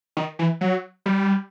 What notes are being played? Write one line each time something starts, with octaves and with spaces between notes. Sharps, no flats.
D#3
E3
F#3
G3